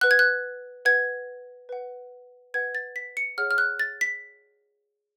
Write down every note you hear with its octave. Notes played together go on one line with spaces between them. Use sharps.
B4 F#5 F#6
G#6
F#6
B4 F#5 G#6
B4 F#5
B4 F#5 G#6
A6
B6
C#7
G#4 C#5 F#5 F6
F6
F#6
A6
B6